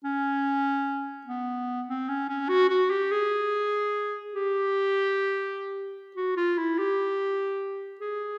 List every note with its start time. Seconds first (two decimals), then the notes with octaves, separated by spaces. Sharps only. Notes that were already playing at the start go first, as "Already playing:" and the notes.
0.04 C#4
1.26 B3
1.88 C4
2.08 C#4
2.29 C#4
2.48 F#4
2.69 F#4
2.90 G4
3.11 G#4
4.34 G4
6.16 F#4
6.37 F4
6.58 E4
6.78 G4
8.01 G#4